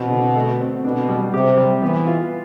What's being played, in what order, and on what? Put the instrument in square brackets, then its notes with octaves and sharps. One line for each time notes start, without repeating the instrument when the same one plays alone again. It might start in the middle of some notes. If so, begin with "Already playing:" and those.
Already playing: [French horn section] B2 [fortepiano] E3 C4
[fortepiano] D3
A3
C4
[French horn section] B2 [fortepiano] D4
[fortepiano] G3
[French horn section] C3 [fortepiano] G4
[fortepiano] G3
[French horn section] E3 [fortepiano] B3
[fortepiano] F4